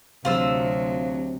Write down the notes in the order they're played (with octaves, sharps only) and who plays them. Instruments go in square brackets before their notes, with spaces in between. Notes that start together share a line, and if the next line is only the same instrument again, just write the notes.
[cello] D2 F#3 [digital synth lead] C3 [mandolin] F4 C5 E6